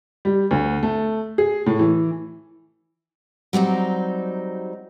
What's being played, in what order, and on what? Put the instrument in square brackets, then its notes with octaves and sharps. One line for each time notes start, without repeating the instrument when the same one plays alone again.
[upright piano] G3
D2
A3
G#4
A2
E3
[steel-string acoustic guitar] F#3 G3 C4 D#4